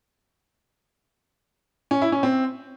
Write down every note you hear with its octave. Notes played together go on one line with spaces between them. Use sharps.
C#4
E4
C#4
C4